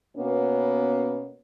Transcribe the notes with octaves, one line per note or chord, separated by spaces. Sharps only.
B2 A#3 B3 C#4